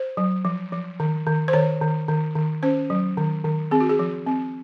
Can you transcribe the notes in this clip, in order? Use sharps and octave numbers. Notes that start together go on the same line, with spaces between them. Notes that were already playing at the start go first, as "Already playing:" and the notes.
Already playing: C5
F#3
F3
F3
D#3
D#3
C5
D#3 C#5
D#3
D#3
D#3
C#4 C5
F#3
D#3
D#3
C4 G#4
F#4
G#4
F3
C4